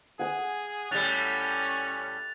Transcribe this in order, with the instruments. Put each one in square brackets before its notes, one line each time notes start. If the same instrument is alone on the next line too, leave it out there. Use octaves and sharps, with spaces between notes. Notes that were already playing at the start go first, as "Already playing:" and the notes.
[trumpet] G#4 [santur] F#5 G#5
[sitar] A2 G3 [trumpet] C#4 [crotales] F#6 A6 F7